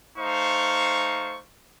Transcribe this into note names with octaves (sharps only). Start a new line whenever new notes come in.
A3 D#4 C5 F5 C#6